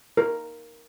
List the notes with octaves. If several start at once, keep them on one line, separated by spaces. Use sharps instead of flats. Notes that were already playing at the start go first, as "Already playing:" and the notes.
A#4